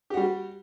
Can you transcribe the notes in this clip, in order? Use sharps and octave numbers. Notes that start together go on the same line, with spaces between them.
G3 F#4 G4